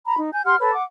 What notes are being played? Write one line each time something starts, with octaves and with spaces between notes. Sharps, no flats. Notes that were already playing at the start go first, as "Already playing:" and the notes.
A#5 B5
D#4
G#5 G6
G4 F#5 C6 F6
A4 B4 C#5
F#5 D6